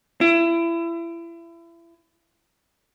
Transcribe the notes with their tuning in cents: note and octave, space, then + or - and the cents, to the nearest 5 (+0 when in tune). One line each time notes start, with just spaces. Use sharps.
E4 +30